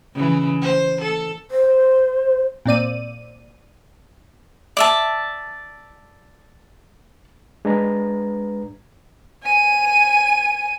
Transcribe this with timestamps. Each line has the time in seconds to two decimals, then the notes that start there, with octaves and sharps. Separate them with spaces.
0.14 C#3 E3
0.61 C5
1.01 A4
1.51 C5
2.66 A#2 C4 D5 D#7
4.77 D5 E5 A5
7.65 G#3 D4 B4 A#5
9.42 G#5 D#7